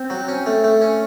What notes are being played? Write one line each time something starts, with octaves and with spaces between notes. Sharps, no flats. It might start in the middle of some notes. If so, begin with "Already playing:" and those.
Already playing: C4
F#3
C#4
A3
A3
C#4